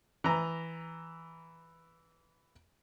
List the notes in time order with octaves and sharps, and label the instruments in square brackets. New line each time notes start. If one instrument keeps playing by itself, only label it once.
[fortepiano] E3 A#5